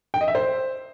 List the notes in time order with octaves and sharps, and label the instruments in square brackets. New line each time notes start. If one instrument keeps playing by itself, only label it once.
[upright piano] G5
D#5
E5
C5